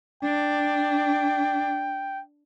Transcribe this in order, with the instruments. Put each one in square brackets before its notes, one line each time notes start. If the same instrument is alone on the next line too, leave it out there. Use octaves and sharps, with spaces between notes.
[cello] D4 [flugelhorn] G5